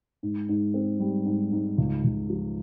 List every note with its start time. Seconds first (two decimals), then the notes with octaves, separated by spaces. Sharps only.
0.23 G#2
0.49 G#2
0.74 C4
1.00 G3
1.26 G#2
1.52 G#2
1.78 C#2
2.04 C#2
2.30 F3